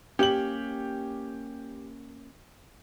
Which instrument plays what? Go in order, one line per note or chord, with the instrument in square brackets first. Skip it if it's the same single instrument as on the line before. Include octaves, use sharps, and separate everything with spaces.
[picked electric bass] A#3 C#4 [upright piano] G4 F#7